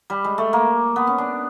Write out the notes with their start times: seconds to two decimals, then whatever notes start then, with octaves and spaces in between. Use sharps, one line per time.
0.10 G3
0.24 G#3
0.38 A3
0.53 A#3
0.96 B3
1.07 C#4
1.18 D4